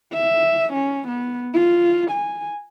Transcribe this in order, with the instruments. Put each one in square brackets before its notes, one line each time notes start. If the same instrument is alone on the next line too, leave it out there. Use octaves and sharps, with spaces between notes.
[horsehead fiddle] E5
C#4
B3
F4
G#5